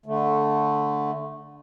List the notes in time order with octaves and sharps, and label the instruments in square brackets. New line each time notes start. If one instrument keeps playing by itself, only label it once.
[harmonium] D3 A3